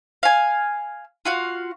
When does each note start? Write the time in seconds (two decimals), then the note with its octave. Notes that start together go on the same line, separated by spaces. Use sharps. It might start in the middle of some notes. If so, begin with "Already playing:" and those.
0.23 F5 G#5
1.25 F4 F#4 F5